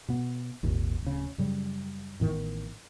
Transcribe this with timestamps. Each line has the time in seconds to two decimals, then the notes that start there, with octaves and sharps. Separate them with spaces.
0.08 B2 B3
0.63 G#1 D#2 A#2
1.02 D1 C#3
1.38 F#2 C#3 F#3 G3
2.20 A1 A2 D#3 B3